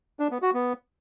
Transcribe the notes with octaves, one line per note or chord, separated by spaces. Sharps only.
D4
B3
F#4
B3